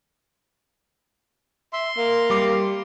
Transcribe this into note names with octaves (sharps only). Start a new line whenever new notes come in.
E5 C6
A#3
G3 D6 C7